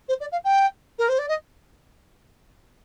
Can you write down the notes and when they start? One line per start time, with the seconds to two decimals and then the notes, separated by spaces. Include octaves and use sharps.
0.08 C5
0.20 D5
0.32 F5
0.44 G5
0.99 A#4
1.09 C5
1.19 D5
1.28 D#5